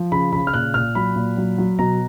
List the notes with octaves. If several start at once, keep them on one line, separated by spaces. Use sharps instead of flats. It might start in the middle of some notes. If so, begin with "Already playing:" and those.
Already playing: F3
C#3 B5
C#3 B5
F6
A#2 F#6
A#2 F6
F#3 B5
A#2
F#3
F#3
B2 A#5